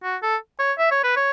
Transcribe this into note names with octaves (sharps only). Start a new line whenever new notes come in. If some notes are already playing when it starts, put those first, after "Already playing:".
F#4
A4
C#5
E5
C#5
B4
C#5